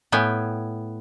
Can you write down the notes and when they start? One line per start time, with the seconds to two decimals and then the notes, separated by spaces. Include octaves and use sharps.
0.12 A2 B3 G5 G#5